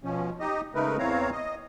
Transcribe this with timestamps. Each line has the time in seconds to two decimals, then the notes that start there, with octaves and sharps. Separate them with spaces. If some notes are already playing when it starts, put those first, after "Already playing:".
0.03 B2 F3 C#4
0.40 D#4 G4 D#5
0.75 C#3 G#3 A3 D#4 A#4 B4
0.99 E2 E3 C4 C#5 F5 A#5
1.32 D#5